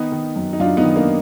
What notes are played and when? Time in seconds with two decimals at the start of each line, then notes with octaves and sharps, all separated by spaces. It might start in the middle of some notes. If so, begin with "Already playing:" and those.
Already playing: D#3 B3 D#4
0.12 D#3
0.36 F#2
0.53 D#4
0.60 F#2 D4 F4
0.77 B3 D#4
0.83 D#3
0.95 A#3 D4